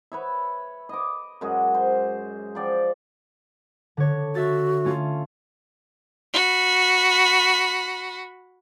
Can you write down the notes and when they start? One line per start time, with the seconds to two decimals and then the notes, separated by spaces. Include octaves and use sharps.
0.12 B4 C#5 E5
0.89 D#5 D6
1.41 F#2 G#3 F#4
1.74 C5
2.55 F3 D5 G5
3.97 D3 C#5
4.35 F#4 E5 A6
4.85 A3 C#4 F4
6.34 F#4 B5